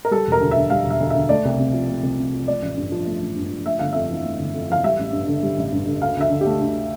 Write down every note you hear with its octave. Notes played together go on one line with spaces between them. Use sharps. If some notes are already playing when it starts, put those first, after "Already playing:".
A#4
G3 A4
E1
A#4
D2
E5
D3
G3 F5
E1 E5
D2
D3 E5
A3 D5
C2
C3
F3
A3
C2
C3
F3
A3 D5
A1
G2
F3
A3
A1
G2
F3
A3 E5
G1 F5
F2 E5
E3
A3
G1
F2
E3 F5
G3 E5
A1
G2
D3
G3
A1
G2
D3
D2 F5
D2 E5
D3
G4
A3
D2